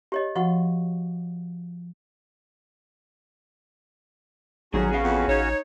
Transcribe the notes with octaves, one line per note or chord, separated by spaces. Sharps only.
G4 C#5 D#5
F3 F#4 F#5 C#6
A1 F2 D#3 F#3 C#4 F#4 G#4
C#3 B3 G#4 F5
F2 B3
A1 D#4 C#5